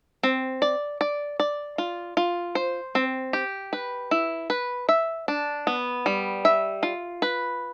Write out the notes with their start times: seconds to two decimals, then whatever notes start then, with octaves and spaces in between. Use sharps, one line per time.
0.23 C4
0.62 D5
1.01 D5
1.40 D5
1.78 F4
2.17 F4
2.55 C5
2.95 C4
3.33 G4
3.73 B4
4.11 E4
4.50 B4
4.89 E5
5.28 D4
5.67 B3
6.06 G3
6.45 E5
6.83 F4
7.22 B4